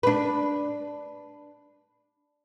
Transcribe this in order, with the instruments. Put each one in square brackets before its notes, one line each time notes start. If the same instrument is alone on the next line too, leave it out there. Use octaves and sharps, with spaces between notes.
[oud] D4 B4